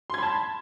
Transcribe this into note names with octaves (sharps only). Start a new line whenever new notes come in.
A5 B5 C6 G#6